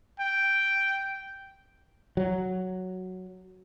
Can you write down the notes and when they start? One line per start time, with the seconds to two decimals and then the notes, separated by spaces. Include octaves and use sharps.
0.20 G5
2.17 F#3